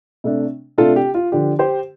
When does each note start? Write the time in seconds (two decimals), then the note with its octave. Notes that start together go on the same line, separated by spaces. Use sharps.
0.24 C3 A3 D4
0.78 C3 A3 D4 F4 A4
0.96 G4
1.14 F4
1.32 D3 F3 D4 G4
1.59 G4 C5